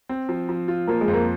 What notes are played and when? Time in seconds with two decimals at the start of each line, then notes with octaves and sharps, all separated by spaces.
0.09 C4
0.29 F3
0.49 F3
0.68 F4
0.87 F3 A#3
1.01 G#3
1.08 F2
1.13 A#3